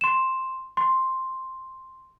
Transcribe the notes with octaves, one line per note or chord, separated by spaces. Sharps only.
C6 E7
C6